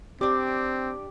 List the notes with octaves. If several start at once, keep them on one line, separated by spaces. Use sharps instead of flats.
C4 D4 G4 D5